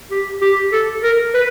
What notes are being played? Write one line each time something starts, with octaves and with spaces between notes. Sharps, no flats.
G4
G4
A4
A#4
B4